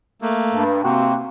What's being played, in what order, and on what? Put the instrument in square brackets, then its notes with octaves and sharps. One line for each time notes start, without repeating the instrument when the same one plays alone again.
[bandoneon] A3 A#3
[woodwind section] G2
[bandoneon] C3 [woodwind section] A#3 C4 F#4